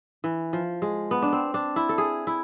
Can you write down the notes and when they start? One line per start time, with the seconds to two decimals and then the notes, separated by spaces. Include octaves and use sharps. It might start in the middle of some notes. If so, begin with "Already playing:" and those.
0.24 E3
0.53 F3
0.82 G#3
1.11 B3
1.22 D4
1.33 C4
1.54 D4
1.76 E4
1.89 A4
1.98 G#4
2.27 E4